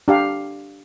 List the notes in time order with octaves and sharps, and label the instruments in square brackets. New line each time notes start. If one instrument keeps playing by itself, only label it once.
[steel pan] D4 G4 F5